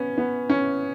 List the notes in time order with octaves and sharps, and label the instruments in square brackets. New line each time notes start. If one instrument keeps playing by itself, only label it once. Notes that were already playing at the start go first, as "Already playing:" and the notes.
Already playing: [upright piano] B3 C#4
B3
C#4